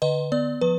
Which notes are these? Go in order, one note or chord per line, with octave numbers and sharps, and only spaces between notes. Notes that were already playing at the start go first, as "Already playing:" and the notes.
D3 B4 D#5
B3 D5
F3 B4